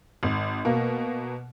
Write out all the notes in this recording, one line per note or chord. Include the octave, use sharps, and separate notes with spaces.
G#1
B2 A#3